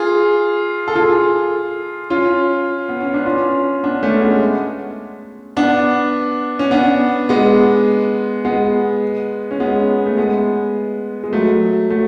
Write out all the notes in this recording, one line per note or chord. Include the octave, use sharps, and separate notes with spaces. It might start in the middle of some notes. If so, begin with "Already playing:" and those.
Already playing: F4 G#4
A4
F4 G#4
C#4 F4
B3
C#4
D4
C#4 F4
B3 D4
A3 C#4
G#3 B3
B3 D4
C#4
B3 D4
G#3 B3
G#3 B3
C#4
G#3 B3
A3
G#3 B3
G#3
F#3 A3
F#3 A3